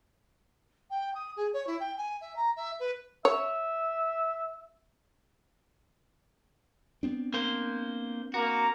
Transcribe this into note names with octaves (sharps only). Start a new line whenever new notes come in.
G5
D#6
G#4
C#5
E4
G5
G#5
E5
A#5
E5
B4
C#5 E5
B3 C4 D4
A#3 C5
A#3 F#4 A#5